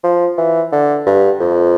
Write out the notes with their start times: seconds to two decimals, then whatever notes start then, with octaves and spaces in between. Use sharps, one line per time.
0.03 F3
0.38 E3
0.72 D3
1.06 G2
1.40 F2